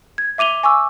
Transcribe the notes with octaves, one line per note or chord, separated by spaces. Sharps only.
G#6
E5 D6 D#7 F7 G7
G#5 C#6 D6 E6